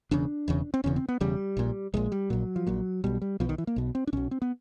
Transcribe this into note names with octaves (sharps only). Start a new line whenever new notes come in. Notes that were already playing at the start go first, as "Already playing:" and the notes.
E1 E2 C#3 D4
E1 E2 C#3
C4
E1 E2 C#3 C#4
C4
B3
E1 E2 C#3 G3
A#1 A#2
A#1 A#2 G#3
G3
A#1 A#2 F#3
F3
A#1 A#2 F#3
B1 B2 G3
G3
B1 B2 F3
D#3
E3
A#3
B1 B2
C4
D4
B1 B2 C#4
C4
B3